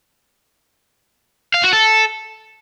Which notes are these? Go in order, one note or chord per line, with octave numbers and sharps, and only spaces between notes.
F5
F#4
A4